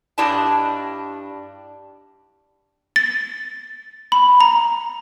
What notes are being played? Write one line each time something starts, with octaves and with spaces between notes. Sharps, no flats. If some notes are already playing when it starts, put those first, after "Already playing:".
G2 G3 D4 E4 D#5 A5
A6
B5
A#5